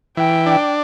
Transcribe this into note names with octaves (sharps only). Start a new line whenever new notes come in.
E3 G5
D4